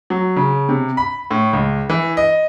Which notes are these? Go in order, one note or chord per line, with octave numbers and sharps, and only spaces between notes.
F#3
C#3
C3
B5
A2
C#2
E3
D#5